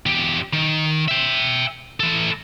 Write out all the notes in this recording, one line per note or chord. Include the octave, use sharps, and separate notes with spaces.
E2 G4
D#3
E5 G5
E3 A4